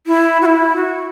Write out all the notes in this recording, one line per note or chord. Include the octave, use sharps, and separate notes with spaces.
E4
F#4
E4
F#4